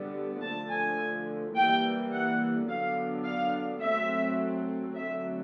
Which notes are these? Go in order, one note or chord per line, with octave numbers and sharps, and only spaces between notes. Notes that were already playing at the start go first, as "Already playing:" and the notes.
Already playing: D3 G3 B3 D4
D3 F3 A3 A5
G#5
E3 G3 A#3 G5
F#5
D3 F#3 B3 D4 F5
F5
F#3 A3 C4 E5
D3 F#3 A3 C4 E5